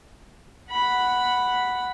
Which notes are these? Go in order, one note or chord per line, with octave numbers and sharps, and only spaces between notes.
F#5 B5